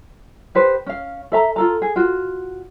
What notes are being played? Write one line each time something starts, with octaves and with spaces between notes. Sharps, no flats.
G4 B4 C5
C#4 F5
A4 E5 A#5
F4 A4 A#5
G#4
F4 F#4